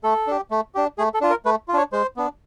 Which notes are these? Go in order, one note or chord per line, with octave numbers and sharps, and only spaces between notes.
A3 A4
D4 G4
A3
D4 G4
A3 G#4
A4
D4 F4
A#4
A3 B4
F4
D4 C#5
G#3 C5
B3 D4